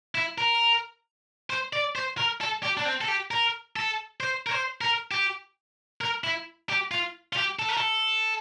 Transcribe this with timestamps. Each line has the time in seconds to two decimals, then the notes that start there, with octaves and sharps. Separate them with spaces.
0.15 E4
0.38 A#4
1.50 C5
1.73 D5
1.96 C5
2.18 A#4
2.41 A4
2.63 G4
2.77 D4
2.85 C4
3.01 A4
3.08 G4
3.31 A#4
3.76 A4
4.20 C5
4.46 A#4
4.51 C5
4.81 A#4
5.11 G4
6.01 A#4
6.24 E4
6.69 G4
6.91 F4
7.33 F4
7.37 G4
7.59 A4
7.69 A#4
7.77 A4